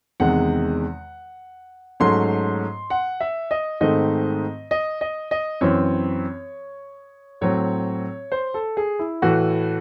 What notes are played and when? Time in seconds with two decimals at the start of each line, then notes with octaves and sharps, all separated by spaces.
0.20 E2 C3 D#3 G#3 F#5
2.00 G#2 F#3 A3 C#4 C6
2.90 F#5
3.20 E5
3.51 D#5
3.81 G#2 D#3 A3 C4 D#5
4.71 D#5
5.01 D#5
5.31 D#5
5.61 F#2 E3 C4 C#5
7.41 A2 F#3 C4 C#5
8.32 C5
8.54 A4
8.77 G#4
8.99 E4
9.22 A2 E3 A3 F#4